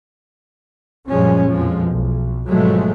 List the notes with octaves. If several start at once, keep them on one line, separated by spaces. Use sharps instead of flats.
A#1 F#2 F3 G3 G#3 C#4
F2 B2 F3 G#3
B1
G#1 B2 F3 F#3 G#3 A3